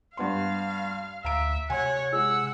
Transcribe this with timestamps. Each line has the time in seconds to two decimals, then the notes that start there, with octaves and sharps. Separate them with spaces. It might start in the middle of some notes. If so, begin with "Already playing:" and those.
0.17 G2 B3 F5 C6
1.24 D2 E5 F5 A#5 D7
1.70 C3 C#5 F#5 G#5
2.13 G#3 F#5 E6